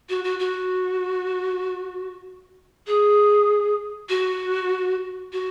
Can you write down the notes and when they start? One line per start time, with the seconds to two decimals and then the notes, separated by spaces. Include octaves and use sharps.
0.09 F#4
0.24 F#4
0.39 F#4
2.87 G#4
4.09 F#4
5.32 F#4